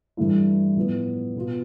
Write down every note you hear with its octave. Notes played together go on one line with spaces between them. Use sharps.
G2 E3 A3 E4
A2 F3 B3
B2 B3 F4